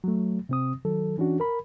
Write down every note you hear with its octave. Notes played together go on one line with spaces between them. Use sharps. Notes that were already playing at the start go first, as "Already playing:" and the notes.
F#3 A3
C3 C4 D#6
D#3 F#3 A4
E3 C#4 D4 F#4
A#4 B5